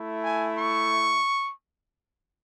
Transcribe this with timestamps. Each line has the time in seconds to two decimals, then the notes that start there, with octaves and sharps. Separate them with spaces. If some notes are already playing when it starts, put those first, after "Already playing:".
Already playing: A3 E4
0.23 G#5
0.57 C#6